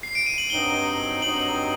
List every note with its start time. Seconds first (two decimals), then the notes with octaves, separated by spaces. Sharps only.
0.03 C7
0.15 D7
0.26 D#7
0.38 F#7
0.50 G2 F#3 C4 D#4 G7
1.22 G2 F#3 C4 D#4 F#7